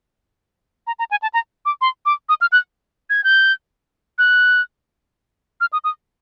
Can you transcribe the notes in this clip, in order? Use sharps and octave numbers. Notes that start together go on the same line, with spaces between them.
A#5
A#5
G#5
A5
A#5
D6
C6
D6
D#6
F6
F#6
G#6
G6
F#6
F6
D#6
D#6